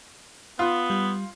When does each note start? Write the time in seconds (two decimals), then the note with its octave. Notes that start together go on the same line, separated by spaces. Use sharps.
0.59 B3 F4
0.90 G3